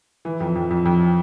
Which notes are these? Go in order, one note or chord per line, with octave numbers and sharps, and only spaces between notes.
E3
F2
F2
F2
F2